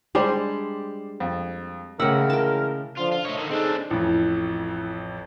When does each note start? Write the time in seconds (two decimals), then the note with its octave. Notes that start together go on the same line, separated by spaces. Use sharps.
0.15 G3 G#3 D4 G4 C5 D5
1.20 F2
2.00 A2 C#3 E3 G#3 A#4 F#5 E6
2.30 G5 A5
2.98 D3 F3 F4
3.12 F4
3.25 A3 C#5 D#5
3.38 D3 D#3
3.51 C4 D4 D#4 G#4 A4
3.91 A1 F2 E4